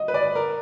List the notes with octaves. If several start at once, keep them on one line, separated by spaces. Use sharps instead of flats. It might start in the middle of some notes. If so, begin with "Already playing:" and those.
Already playing: D#5
B4
D5
A#4